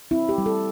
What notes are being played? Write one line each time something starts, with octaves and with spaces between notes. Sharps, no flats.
C4 E4
G4
G3
A4